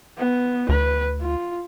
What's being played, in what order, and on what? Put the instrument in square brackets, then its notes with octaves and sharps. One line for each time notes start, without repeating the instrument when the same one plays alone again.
[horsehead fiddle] B3
[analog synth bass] D2 [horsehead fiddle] B4
[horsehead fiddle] F4